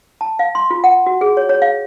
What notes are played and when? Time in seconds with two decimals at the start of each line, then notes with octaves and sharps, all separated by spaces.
0.21 A5
0.39 F5
0.55 C6
0.71 F4
0.84 F#5
1.06 F#4
1.21 G#4
1.37 C#5
1.49 C#5
1.62 F5